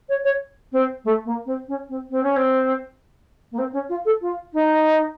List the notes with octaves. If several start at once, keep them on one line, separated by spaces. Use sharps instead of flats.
C#5
C#5
C4
A3
A#3
C4
C#4
C4
C4
C#4
C4
A#3
C4
C#4
F4
A4
F4
D#4